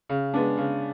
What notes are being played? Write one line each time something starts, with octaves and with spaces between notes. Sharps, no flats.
C#3
G#3 B3 D4
C#3